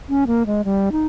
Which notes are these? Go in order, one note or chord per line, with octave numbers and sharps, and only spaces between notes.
C#4
A#3
G#3
G3
D#4